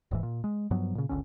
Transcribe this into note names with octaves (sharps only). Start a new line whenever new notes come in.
D#1 G#2 E3
A#2
G#3
G2 F3 F#3 B3
A#2 C#3
G1 C#2 D3 C#4